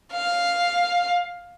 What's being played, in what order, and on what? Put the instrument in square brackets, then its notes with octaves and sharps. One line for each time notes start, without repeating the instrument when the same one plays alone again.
[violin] F5